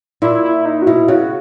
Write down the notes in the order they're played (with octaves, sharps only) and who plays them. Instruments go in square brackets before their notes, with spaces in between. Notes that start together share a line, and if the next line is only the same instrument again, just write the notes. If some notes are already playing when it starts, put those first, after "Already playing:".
[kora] A#2 [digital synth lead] E4
[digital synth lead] E4
D#4
F#4
[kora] B2 [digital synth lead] E4
[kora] C#3 [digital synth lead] F#4